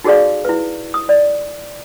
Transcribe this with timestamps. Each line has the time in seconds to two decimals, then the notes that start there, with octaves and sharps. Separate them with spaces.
0.04 D#4 F#4 G#4 A4 D5 F5
0.45 E4 B4
0.94 D#6
1.09 D5